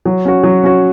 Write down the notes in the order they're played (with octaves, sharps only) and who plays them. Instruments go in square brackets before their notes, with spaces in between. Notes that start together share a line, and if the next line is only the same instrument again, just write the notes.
[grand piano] F#3
C#4 F#4
F#3
C#4 F#4